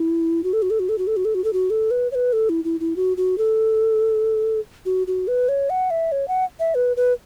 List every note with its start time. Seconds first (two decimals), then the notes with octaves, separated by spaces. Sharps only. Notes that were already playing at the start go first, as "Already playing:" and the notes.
Already playing: E4
0.44 F#4
0.53 A4
0.62 F#4
0.70 A4
0.79 F#4
0.89 A4
0.98 F#4
1.07 A4
1.17 F#4
1.25 A4
1.35 F#4
1.44 A4
1.53 F#4
1.70 A4
1.91 B4
2.12 C#5
2.15 B4
2.33 A4
2.49 E4
2.64 E4
2.80 E4
2.96 F#4
3.17 F#4
3.38 A4
4.86 F#4
5.07 F#4
5.28 B4
5.49 C#5
5.70 F#5
5.91 E5
6.12 C#5
6.28 F#5
6.60 E5
6.75 B4
6.97 B4